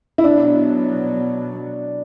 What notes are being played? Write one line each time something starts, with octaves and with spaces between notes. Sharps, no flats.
E4
B2 F#3 B3 D4